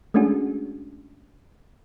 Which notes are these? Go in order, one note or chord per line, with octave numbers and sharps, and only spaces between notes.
G#3 A3 C#4 D4 F#4 G#4